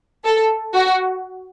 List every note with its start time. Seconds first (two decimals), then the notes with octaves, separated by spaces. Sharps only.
0.24 A4
0.75 F#4